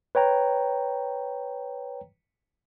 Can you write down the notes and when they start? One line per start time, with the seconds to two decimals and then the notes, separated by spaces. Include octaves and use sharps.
0.15 B4 C#5 G5 A#5